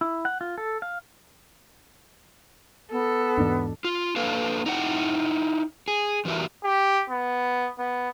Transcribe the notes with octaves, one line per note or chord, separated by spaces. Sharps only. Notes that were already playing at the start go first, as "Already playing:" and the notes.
E4
F#5
F4
A4
F5
B3 A4
E2 G#2 B2 E3 D4
F4
A#3 D4 A4 B4 F5
D#4 E4 B4 F#5 G5
G#4
E2 E3 F#4 G4 A#4 E5
G4
B3
B3